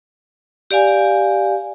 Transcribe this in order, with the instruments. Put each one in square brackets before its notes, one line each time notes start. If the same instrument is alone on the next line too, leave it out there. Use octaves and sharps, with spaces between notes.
[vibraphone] G4 D5 F5 G#5